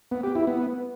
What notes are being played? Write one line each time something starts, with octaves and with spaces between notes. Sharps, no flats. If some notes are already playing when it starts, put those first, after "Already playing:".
B3
G4
E4
B3